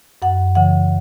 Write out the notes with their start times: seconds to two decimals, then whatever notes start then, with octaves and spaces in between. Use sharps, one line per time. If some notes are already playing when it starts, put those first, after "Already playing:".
0.22 F#2 F#5
0.55 C#3 E3 F#5